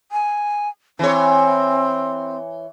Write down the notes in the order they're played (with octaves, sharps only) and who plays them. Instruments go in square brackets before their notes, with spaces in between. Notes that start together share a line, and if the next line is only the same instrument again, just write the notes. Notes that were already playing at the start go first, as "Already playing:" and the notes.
[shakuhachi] G#5
[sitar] E3 C#5 [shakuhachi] C4